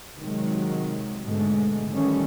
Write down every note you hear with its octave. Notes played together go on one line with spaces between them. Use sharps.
C3 D#3 F#3 G#3
G#2 B2 D3 G#3 A3
D#3 E3 G3 A3 C#4